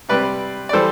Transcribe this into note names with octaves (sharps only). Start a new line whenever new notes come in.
C3 G3 C4 B4 D5
D5
E3 G3 A4 C5